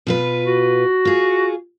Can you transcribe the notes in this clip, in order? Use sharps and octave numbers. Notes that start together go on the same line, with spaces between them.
B2 F4 B4
F#4
F4 G#4